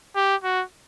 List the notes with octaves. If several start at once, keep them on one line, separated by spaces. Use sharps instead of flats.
G4
F#4